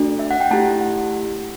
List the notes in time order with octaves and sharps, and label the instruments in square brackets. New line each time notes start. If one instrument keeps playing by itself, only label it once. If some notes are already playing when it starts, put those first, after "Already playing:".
Already playing: [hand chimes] A3 D4 F#4 A4
E5
F#5
G5
A3 E4 G4 A5
F#5